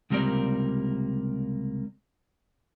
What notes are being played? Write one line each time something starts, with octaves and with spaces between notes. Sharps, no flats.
C#2 C3 G3 A#3 A#4 D5